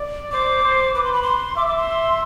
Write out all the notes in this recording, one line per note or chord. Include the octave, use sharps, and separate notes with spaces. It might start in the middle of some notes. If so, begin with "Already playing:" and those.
Already playing: D5
C5 D6
C5
B4 D6
C6
B5
C6
E5 D6
D6
C6